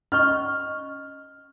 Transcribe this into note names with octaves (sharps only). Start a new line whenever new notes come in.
C#4 D#5 C#6 F6